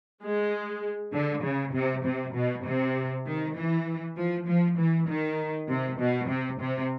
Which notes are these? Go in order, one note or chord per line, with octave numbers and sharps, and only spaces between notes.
G#3
D3
C#3
C3
C3
B2
C3
D#3
E3
F3
F3
E3
D#3
C3
B2
C3
C3